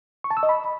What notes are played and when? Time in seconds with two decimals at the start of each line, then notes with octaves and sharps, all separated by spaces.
0.24 C#6
0.31 A5
0.37 E6
0.43 D#5
0.49 B5